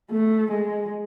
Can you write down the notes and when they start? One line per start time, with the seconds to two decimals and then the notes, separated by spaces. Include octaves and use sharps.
0.11 A3
0.52 G#3